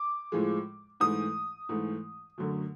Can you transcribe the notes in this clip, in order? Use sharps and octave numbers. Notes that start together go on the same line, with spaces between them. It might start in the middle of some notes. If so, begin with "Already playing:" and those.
Already playing: D6
A2 F3 G#3
G#2 E3 A3 D#6
G#2 E3 A3
F#2 D3 F#3 A3